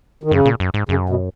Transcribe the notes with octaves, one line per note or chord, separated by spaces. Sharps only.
D#3
F#2 C#3
A#2
F#2
G#2
F#2 C#3
B2